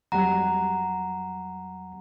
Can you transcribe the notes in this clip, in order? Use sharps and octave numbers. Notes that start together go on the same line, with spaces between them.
F2 F#3 G3 F#5 A#5